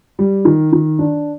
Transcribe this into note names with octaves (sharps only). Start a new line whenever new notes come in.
G3
D#3
D#3
D4